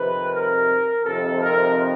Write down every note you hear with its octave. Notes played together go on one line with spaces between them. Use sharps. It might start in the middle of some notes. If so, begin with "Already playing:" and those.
Already playing: F2 C3 D#3 B4
A#4
F2 C3 D#3 A4
A#4